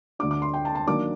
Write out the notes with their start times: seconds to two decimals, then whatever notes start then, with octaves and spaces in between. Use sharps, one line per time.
0.19 D2 D3 A3 D4 D6
0.31 D6
0.42 C6
0.54 G5
0.65 A5
0.75 A5
0.87 D#3 F#3 A#3 D4 D6